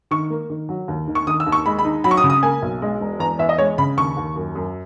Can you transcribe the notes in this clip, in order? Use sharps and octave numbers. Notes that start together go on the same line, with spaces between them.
D#3 C#6
A#3
D#3
F#3
D#2
D#3
C#6
D#3 D#6
E6
D#2
C#6
G#3 B5
B5
D#4
F#3 B5
C#6
D#6
C#3
D#6
A#3 G#5
B1
G#3
E1
E2 A#5
E2 E5
D#5
G#3 C#5
C#3 B5
D#2 C#6
D#2
F#2
F#2